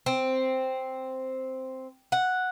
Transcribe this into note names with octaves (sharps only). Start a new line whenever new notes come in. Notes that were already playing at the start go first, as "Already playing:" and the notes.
C4
F#5